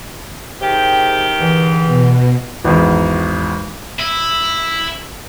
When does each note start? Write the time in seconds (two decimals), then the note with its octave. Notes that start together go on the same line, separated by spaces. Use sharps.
0.62 C3 D#3 G4 G#4 G5
1.40 E2 D3 E3
1.85 B2
2.64 G#1 E2
4.00 E4